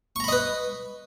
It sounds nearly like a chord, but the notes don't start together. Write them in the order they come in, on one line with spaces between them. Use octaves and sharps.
C#6 A#5 B5 D#5 B4